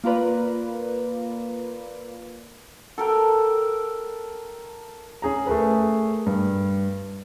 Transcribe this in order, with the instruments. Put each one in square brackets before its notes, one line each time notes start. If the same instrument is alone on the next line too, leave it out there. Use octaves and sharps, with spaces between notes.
[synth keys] A#3 F4 A#4 B4 D5
[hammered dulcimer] A4 A#4 G5
[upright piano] C#4 G#4 A#5
A3 G#4 A#4 B4
G2